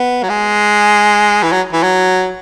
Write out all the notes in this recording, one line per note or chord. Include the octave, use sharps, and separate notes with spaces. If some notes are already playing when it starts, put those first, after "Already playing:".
Already playing: B3
F#3
G#3
E3
F#3
E3
F#3